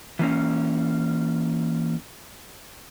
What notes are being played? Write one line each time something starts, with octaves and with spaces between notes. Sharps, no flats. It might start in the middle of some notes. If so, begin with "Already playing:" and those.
E3 A#3 C#4